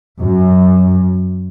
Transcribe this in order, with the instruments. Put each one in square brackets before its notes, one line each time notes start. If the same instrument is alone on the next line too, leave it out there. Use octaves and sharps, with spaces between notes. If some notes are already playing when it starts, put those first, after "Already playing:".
[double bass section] F#2